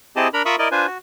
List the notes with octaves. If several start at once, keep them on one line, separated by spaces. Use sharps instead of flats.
C4 E4 G4 G#4 D#5 A5
D4 A#4 A#5 B5
F4 A#4 E5 B5 C#6 D#6
E4 A#4 D5 D#5
D4 F4 B4 C5 G#5
F#4